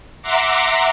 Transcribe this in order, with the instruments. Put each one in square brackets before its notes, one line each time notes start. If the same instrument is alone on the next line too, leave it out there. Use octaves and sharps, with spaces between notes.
[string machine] E5 F#5 A#5 C6 D6